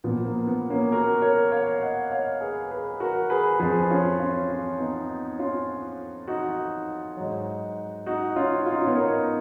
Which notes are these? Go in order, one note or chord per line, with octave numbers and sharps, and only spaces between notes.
A#2 F3 B3
A#3
B3
A#3 C#4
F#4 A#4
A#4 C#5
C#5 F5
D#5 F#5
C#5 F5
G#4 B4
G#4 B4
F#4 A#4
G#4 B4
F2 F3 G#4 B4
C#4 F4
C#4 F4
C#4 F4
B3 D#4
C#4 F4
D#4 F#4
G#2 F#3
D#4 F#4
C#4 F4
F4
D#4
C#4
B3 D#4
A#4 C#5